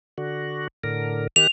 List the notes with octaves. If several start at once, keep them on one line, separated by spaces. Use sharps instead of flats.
D3 F#4
A2 D3 A#4
D#3 G4 F#6 F7